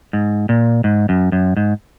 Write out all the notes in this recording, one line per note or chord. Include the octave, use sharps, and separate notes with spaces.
G#2
A#2
G#2
F#2
F#2
G#2